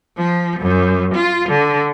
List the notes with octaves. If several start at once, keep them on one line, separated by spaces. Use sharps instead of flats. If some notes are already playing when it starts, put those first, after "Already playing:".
F3
F#2
F4
D3